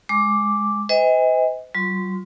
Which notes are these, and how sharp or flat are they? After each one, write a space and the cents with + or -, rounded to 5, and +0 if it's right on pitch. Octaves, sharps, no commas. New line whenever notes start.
G#3 +0 D6 +0
C5 -45 D#5 +35 G#5 -35
F#3 +40 F4 +25 C6 -25